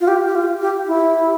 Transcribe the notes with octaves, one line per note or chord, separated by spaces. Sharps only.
F4
G4
G4
F4
G4
E4